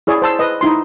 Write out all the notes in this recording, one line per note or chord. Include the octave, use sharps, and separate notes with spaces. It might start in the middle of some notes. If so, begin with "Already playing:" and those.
E4 G#4 C#5 D5
C5 A5 E6
B4 D#5
D#4 E4 C6